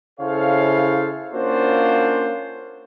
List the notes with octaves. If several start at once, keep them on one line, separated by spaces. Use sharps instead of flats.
C#3 E4 A4 C5 C#5 F5
A#3 C#4 D4 F4 F#4 C5